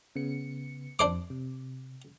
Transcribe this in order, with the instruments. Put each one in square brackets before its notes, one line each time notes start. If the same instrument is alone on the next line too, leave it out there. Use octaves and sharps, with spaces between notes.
[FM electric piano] C#3 B3 C#7
[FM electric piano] F2 [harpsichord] D4 C5 D6
[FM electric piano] C3